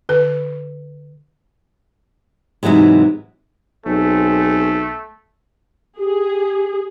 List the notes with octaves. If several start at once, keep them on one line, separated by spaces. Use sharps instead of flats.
D3 B4
G#2 C3 E3 F#3 G#3
B1 A3 C4 G#4
G4 G#4